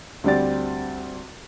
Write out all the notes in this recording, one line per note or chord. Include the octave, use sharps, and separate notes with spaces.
D2 G3 C4 D5 A6